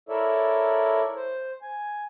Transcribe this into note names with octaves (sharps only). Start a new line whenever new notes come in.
E4 A4 A#4 C#5 D5 E5
C5
G#5